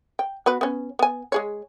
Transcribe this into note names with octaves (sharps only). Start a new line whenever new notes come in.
G5
B3 F#4 B4
B3 C#4
B3 G#5
G#3 G#4 C#5